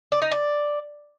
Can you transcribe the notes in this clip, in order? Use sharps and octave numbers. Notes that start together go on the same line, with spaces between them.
D5
D#4
D5